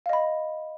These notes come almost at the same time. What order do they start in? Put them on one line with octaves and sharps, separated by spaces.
F5 D#5 B5